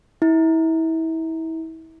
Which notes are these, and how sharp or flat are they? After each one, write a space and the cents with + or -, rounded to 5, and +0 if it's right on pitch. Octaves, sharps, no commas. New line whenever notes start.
E4 -30